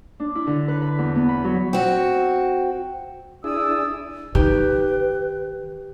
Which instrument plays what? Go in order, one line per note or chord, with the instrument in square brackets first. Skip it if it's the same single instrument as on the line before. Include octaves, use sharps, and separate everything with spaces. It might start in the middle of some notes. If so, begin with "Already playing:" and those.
[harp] D4
E4
D3
B4
B5
E2
B3
B5
F#3
[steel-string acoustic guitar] C4 F#4
[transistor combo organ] D4 E4 G#4 [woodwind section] D5 D#6 E6
[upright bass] D#3 [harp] G4 [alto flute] B4